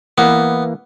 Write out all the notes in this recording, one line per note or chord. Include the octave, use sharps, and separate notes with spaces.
E3 A#3 B3